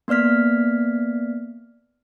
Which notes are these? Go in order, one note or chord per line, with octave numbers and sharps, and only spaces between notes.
A#3 B3 D5 F6 B6